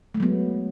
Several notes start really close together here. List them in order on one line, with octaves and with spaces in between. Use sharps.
A3 G#3 F#3 B3